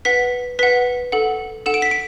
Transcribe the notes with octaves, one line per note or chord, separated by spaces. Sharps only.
B4 F#5 B6
B4 F#5 B6
A4 F#5
A4 F#5 E7
D7
B6
D7